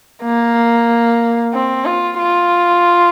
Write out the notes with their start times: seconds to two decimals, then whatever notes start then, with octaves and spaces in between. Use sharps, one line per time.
0.23 A#3
1.53 C4
1.86 F4
2.19 F4